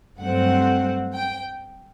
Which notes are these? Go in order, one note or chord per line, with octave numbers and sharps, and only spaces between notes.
G2 F#3 A3 C4 F#5
G5